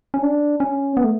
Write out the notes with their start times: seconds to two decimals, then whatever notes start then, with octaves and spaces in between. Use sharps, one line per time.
0.14 C#4
0.23 D4
0.60 C#4
0.97 B3
1.04 A3